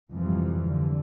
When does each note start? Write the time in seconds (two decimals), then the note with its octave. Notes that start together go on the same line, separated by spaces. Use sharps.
0.11 F2 G#2 C3 E3 F3 G3
0.66 D3